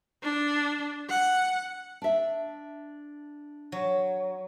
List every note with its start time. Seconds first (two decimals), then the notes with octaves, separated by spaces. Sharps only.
0.23 D4
1.09 F#5
2.02 D4 E5
3.72 F#3